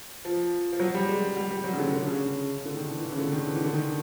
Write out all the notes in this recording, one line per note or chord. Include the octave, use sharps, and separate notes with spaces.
F3
F3
F#3
G3
G#3
G#3
G3
G3
F#3
C#3
D3
D3
C#3
D3
D#3
E3
E3
C#3
D3
D#3
E3
D#3
D3
D#3